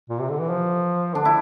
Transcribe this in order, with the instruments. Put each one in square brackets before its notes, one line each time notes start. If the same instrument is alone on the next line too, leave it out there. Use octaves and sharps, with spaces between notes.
[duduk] A#2
C3
D3
E3
F3
[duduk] D3 [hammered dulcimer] D4
[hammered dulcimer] E4